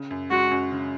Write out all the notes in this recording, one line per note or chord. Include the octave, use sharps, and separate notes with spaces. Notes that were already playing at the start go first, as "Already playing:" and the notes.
Already playing: C#3
F#2
G#3 F#4
F#2
C#3